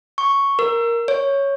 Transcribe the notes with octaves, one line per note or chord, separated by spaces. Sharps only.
C#6
A#4
C#5